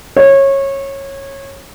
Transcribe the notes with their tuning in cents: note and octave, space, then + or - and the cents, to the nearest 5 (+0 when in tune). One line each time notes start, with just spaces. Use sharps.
C#5 -20